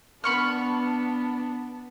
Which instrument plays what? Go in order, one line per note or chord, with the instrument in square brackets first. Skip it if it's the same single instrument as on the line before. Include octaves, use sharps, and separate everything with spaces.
[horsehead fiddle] B3 D4 [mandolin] B5 C#6 F6